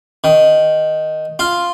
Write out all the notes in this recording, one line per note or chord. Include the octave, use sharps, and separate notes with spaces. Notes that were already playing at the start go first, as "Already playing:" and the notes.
D#3
F4